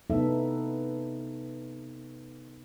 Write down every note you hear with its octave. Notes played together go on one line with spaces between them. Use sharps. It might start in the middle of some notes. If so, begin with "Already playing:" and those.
C3 B3 D#4 A4 E5